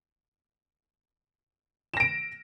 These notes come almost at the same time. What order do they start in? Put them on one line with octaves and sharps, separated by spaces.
E7 A#6 D7